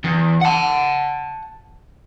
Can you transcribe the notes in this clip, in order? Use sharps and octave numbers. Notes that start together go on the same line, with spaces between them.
E2
F#5 A5